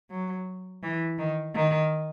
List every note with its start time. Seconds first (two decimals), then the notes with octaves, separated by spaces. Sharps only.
0.10 F#3
0.83 E3
1.18 D#3
1.55 D#3